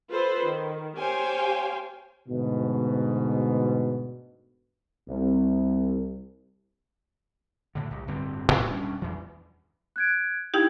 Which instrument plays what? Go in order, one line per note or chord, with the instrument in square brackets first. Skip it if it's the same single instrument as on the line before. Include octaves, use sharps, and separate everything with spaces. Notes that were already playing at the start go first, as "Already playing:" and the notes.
[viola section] F4 A4 B4 C5
D#3
G4 C5 C#5 F5 G5 G#5
[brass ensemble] D2 G#2 B2
[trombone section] C2
[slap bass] A2 D3
C2
D1 G2 D3 C4
G#2 A#3
E1 G3 C#4 D4
E2 E3
[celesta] F#6 G#6 D7
[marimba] D#4 E4 G4 [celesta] G5 G#6